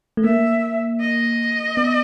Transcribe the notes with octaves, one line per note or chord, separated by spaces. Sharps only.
A3
A#3 E5
D#5
B3